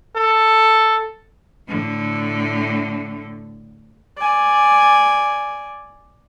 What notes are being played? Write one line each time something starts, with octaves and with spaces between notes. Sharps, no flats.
A4
A2 D3
D5 G#5